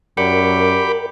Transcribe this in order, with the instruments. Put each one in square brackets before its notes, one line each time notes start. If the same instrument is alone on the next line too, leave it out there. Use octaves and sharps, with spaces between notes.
[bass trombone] F#2 [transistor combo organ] G4 B5 D6 [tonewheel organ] A#4 [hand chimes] D5 F#5 C#7